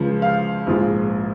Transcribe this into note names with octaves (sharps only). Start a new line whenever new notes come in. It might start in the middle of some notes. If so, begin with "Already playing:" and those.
Already playing: C#2 C#3 F3
F5
A#1 G#2 F3